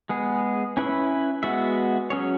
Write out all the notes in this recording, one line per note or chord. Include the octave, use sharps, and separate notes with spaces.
G#3 B3 G#4
C#4 E4 B4 E5
G#3 B3 F#4 E5
F#3 C#4 G#4 C#5